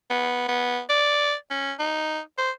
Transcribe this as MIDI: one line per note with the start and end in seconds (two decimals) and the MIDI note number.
0.10 0.48 59
0.48 0.81 59
0.89 1.34 74
1.50 1.72 61
1.79 2.20 63
2.38 2.51 72